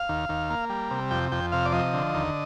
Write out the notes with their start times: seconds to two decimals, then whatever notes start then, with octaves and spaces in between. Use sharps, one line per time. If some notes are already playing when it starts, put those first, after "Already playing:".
Already playing: F5
0.09 D#2
0.29 D#2
0.50 A#3
0.70 G3
0.91 C3
1.11 F2 G5
1.32 F2 G5
1.52 C3 F5
1.65 D5
1.73 F3 D#5
1.93 D3
2.14 D#2